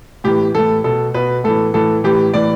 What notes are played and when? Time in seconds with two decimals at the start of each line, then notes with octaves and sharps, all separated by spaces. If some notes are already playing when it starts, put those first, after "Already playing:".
0.24 A2 E3 G4
0.55 A2 E3 A4
0.84 B2 A4
1.14 B2 B4
1.44 A2 E3 A4
1.74 A2 E3 A4
2.04 A2 E3 G4
2.34 A2 E3 D5